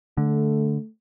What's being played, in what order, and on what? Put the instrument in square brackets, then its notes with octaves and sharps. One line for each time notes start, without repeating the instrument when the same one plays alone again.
[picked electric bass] D3 [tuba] A3